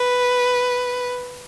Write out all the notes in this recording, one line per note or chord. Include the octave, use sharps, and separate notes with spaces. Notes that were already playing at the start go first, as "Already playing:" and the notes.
Already playing: B4